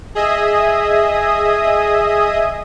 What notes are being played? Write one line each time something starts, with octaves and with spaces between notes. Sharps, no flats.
G#4 D#5 E5 D#6